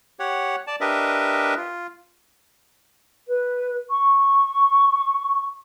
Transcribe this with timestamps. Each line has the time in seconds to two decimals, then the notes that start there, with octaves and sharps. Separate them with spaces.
0.19 G4 C#5 F#5
0.67 D5 A5
0.81 D4 G4 A#4 B4 D#5 E5
1.57 F4
3.29 B4
3.90 C#6